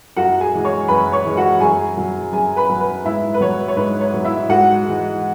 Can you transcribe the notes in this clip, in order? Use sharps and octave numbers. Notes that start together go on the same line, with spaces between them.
F#2 F#4 F#5
G#4 G#5
E3 G#3
C#5 C#6
F#2 B4 B5
C#5 C#6
E3 G#3
F#4 F#5
F#2 G#4 G#5
F#3
F#2 G#4 G#5
B4 B5
F#3
B4
G#2 E4 E5
B4
F#3 C#5
C#5
G#2 B4
C#5
F#3
E4 E5
G#2 F#4 F#5
E3 G#3